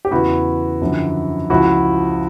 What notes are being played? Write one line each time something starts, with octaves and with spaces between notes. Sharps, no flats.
G4
E2 C#3 E3 E4 F#4
F#2 D3 F3
C#2 C#3 F3 E4 F#4